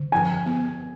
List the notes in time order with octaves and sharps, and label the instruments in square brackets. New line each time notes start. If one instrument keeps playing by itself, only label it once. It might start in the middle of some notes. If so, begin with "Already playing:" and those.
Already playing: [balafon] D3
[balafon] F3 [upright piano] G#5
[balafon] B3